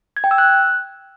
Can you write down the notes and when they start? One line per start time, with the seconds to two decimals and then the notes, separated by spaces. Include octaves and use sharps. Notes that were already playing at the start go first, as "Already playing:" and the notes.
0.17 G#6
0.24 G5
0.31 E6
0.38 F#6